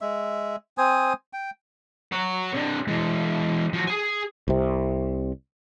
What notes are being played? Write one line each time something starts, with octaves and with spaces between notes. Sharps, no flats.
G#3 E5
C4 C5 G#5 D#6
G5
C#5 F#5
C3 D4
E3 G#3
F3 F#4
G#4 G#5
C2 C3